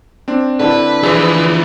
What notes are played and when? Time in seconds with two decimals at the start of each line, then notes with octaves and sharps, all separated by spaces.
0.28 C4 D4
0.60 D3 E4 A4 B4
1.03 E3 F3 G#4 E5